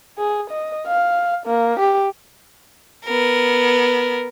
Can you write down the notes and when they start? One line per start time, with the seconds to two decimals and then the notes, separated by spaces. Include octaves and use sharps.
0.18 G#4
0.50 D#5
0.87 F5
1.46 A#3
1.80 G4
3.06 B3 A#4